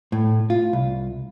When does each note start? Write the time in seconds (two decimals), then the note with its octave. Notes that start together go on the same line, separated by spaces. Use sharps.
0.12 A2
0.50 F4
0.73 C2